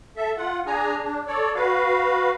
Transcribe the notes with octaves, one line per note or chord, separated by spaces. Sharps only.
A4 E5
F4 F#5
D4 G#4 G#5 A#5
D4
A4 C#5 D5
F#4 B4 F5